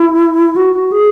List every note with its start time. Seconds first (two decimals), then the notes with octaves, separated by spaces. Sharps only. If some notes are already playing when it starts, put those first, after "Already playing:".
Already playing: E4
0.56 F#4
0.92 G#4